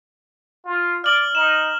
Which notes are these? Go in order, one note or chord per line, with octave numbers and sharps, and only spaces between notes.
F4
D5 F6 F#7
D#4 E7